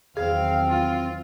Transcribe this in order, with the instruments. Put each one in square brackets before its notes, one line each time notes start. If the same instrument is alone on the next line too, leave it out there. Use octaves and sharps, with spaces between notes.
[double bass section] E2 D#3 F#3 [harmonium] C4 [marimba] G#4 [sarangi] F5
[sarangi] F4